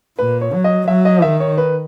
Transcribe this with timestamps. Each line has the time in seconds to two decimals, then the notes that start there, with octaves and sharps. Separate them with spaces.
0.19 A#2 B4
0.41 C#5
0.53 F#3
0.64 D#5
0.88 F#3 E5
1.05 D#5
1.22 D#3 E5
1.40 C#5
1.58 B4